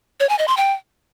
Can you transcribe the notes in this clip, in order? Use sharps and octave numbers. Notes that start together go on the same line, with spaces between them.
C#5
G#5
D#5
C6
G5